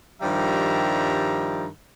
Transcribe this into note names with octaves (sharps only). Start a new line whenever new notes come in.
G2 D#3 F3 G3 E5 A#5